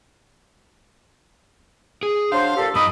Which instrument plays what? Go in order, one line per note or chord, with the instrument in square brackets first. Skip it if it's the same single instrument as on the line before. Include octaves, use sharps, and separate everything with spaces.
[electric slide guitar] G#4
[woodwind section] F#3 D4 C5 [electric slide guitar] F5
[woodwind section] A#2 G4 A4
[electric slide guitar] F#2 D#5 [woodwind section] D#4 B5 D#6